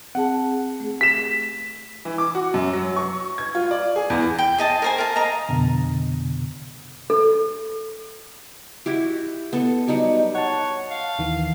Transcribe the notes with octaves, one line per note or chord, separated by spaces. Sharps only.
C4 G#4 F#5 A5
A3 G#4
G4 B6 E7
E3
D6
F#4
F#2
F#3
C#6
G#6
F4
D5
G#4
E2
G5
G#4 D#5 A5
A#4 C5 G#5
A#4 F5 A5
D#5 F5 A#5
F2 B2 D3
A4
E4 F#4 G4
B3 A4
F#3 G3 D#4 G4
C#5 F#5 A5
F5
D#2 D#3 E3